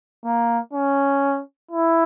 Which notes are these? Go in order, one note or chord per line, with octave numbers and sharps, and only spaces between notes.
A#3
C#4
E4